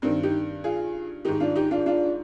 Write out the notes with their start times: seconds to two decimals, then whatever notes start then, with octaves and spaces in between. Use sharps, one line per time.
0.02 G2 D#3 C4 D#4
0.23 D#4 G4
0.64 F4 G#4
1.25 G#2 D#3 D#4 G4
1.40 D4 F4
1.56 D#4 G4
1.71 D4 F4
1.86 D4 F4